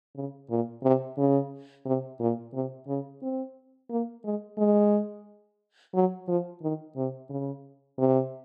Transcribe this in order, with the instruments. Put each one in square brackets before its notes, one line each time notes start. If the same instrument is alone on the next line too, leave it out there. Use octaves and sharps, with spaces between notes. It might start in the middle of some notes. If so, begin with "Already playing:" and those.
[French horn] C#3
A#2
C3
C#3
C3
A#2
C3
C#3
C4
A#3
G#3
G#3
F#3
F3
D#3
C3
C#3
C3